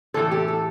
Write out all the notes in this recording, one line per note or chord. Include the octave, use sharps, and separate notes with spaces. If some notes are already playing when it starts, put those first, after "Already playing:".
A2 E3 A3 A4
G4
A4